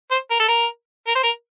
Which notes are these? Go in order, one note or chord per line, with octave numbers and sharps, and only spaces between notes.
C5
A#4
A4
A#4
A#4
C5
A#4